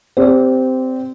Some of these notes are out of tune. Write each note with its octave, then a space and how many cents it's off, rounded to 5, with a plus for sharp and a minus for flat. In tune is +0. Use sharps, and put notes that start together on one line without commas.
C4 -15 G4 +0 D5 -35